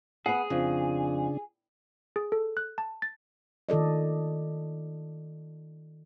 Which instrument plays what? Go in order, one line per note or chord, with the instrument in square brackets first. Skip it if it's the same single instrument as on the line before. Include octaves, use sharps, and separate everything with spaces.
[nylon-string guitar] B3 F#5 [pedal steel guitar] G#4
[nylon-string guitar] F2 [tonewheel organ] C#3 D4
[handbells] G#4
A4
F#6
A5
A6
[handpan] D#3 F4 A4 D5 D#5